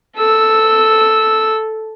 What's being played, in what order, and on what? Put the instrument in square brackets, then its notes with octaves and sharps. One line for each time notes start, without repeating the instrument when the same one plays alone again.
[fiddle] A4 E6